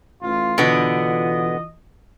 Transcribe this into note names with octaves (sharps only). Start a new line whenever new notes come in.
A1 F4
B2 D3 E3 B3 F4 D#5